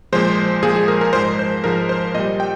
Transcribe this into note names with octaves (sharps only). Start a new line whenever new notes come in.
A#2 F3 G#3 C5
A#2 F3 G#3 G#4
G#4
A#4
A#4
G#2 F3 G#3 C5
C5
G#2 F3 G#3 A#4
C5
A#2 G3 D#5
G5